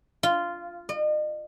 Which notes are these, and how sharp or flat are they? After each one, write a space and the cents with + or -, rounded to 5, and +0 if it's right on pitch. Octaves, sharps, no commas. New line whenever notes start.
F4 -10
D#5 -40